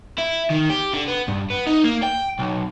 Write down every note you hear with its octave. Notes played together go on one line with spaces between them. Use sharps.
E4
D#3
G4
D3
B3
G2
B3
D#4
A#3
G5
B1